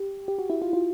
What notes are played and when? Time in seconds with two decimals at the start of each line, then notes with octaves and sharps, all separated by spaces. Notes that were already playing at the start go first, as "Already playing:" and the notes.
Already playing: G4
0.28 G4
0.39 F#4
0.50 E4
0.62 F4
0.73 F4